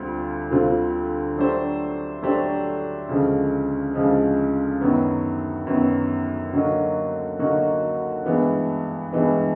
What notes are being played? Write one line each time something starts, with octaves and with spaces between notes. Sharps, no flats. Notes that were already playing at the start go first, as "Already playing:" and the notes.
Already playing: D2 D3 G3 C4 F4
D2 D3 G3 C4 F4
F#3 A3 D4 G4 C5
F#3 A3 D4 G4 C5
D2 C#3 F3 G#3
D2 C#3 F3 G#3
F#2 D#3 F#3 B3
F#2 D#3 F#3 B3
D3 F#3 A#3 D#4 F#4
D3 F#3 A#3 D#4 F#4
G2 E3 G#3 B3
G2 E3 G#3 B3